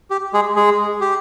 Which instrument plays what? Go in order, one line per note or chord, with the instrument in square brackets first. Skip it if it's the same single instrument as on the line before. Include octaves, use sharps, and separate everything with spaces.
[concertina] G4
G#3 G#4
G#3 G#4
G4